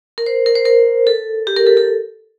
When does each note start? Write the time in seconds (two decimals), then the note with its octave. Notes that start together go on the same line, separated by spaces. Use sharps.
0.18 A#4
0.26 C5
0.46 A#4
0.55 C5
0.65 A#4
1.07 A4
1.47 G4
1.56 A#4
1.67 A4
1.77 A4